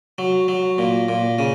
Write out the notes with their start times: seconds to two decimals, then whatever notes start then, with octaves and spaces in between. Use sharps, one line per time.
0.18 F#3
0.48 F#3
0.78 A#2
1.09 A#2
1.39 C#3